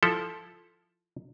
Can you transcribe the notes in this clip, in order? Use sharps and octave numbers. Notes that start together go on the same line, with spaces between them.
F3 E4 A4